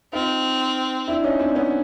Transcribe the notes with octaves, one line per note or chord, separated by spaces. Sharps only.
C4 D#4 F4
D4 E4
C#4 D#4
C4 D4
B3 C#4